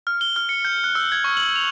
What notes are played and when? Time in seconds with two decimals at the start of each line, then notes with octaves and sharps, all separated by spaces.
0.07 F6
0.21 G7
0.36 F6
0.49 C#7
0.65 G6
0.84 F#6
0.95 E6
1.12 G#6
1.24 C#6
1.37 F#7
1.56 F7